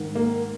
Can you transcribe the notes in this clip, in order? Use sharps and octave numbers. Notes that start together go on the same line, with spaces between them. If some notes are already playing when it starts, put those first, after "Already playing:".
Already playing: G#2 D#3
A#3